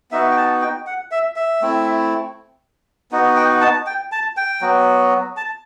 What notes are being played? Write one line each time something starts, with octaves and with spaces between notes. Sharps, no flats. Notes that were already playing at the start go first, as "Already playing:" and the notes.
B3 D#4 F#4 E5
G5
A5
G5
F#5
E5
E5
A3 C4 E4
B3 D#4 F#4
G5
A5
G5
A5
G5
F#3 B3 F#4
A5